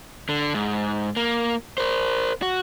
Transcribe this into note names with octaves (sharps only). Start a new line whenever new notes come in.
D3
G#2
A#3
A#4 C5
F#4